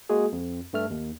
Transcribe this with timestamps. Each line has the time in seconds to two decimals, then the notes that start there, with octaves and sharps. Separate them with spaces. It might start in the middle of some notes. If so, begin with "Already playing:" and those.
0.09 G#3 A#3 F#4 G#4
0.32 F2
0.73 G2 A3 F6
0.90 D#2